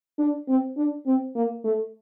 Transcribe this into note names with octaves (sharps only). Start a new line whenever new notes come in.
D4
C4
D4
C4
A#3
A3